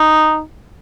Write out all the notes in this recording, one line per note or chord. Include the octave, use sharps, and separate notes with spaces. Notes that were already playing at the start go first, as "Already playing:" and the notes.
Already playing: D#4